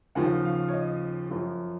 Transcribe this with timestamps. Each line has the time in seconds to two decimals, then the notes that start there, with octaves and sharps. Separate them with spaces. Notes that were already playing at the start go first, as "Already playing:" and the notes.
0.15 D#2 C#3 F3 F#5
0.45 F5
0.68 C#5
0.73 D#5
1.30 F#2 F3